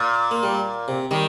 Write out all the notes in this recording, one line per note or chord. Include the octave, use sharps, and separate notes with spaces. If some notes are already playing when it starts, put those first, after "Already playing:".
Already playing: A#2
A#3
G3
C3
D#3 G3